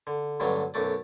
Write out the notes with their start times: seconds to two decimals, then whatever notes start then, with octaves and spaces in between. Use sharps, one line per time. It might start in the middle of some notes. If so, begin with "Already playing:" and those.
0.07 D3
0.40 A1 G2 D3 F#3
0.74 B1 F#2 A3 D5